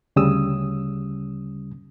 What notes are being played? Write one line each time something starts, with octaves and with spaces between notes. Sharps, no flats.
D2 C#3 G3 C#4 D#6 E6